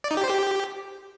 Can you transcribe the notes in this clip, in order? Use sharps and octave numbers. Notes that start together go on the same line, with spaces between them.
D5
D#4
G4
C5
G4